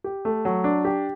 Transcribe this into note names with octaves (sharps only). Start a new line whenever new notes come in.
G4
A3
F#3
D4
G4